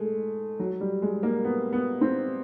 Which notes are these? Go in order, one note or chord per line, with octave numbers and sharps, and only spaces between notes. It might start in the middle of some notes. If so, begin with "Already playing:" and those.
Already playing: G#3 A3
F#3
G3
G#3
A#3
B3
B3
C4